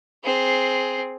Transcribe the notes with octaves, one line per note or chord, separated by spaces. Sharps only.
C4 G#4